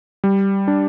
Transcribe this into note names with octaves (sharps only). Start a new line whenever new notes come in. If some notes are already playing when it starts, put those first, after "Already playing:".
G3
D4